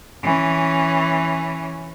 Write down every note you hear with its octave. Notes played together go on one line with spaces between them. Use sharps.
E3 C#4